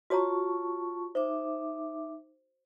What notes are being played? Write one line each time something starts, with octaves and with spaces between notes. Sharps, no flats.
F4 F#4 C#5 A5 A#5 C#6
D#4 C5 E5 D6